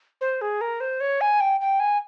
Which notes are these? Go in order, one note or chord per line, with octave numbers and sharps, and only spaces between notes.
C5
G#4
A#4
C5
C#5
G#5
G5
G5
G#5